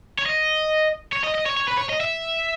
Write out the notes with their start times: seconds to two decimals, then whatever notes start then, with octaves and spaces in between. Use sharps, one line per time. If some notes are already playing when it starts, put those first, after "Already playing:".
0.19 C#5
0.26 D#5
1.12 C#5
1.24 D#5
1.34 D#5
1.46 C#5
1.57 C#5
1.68 B4
1.77 C#5
1.89 D#5
2.00 E5